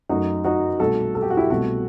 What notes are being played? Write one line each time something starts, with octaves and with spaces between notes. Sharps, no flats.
F#2 F#3 A3 D#4 F#4
D#4 F#4
C2 B2 A3 F#4 A4
A4
G4
F#4
E4 G4
C2 B2 A3 F#4 A4